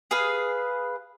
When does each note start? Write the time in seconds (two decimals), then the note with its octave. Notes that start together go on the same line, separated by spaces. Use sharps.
0.11 G#4 B4 F5